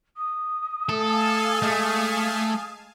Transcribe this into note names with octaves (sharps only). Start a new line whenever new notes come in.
D#6
A3 A4 F5 G#5 A5
G#3 A3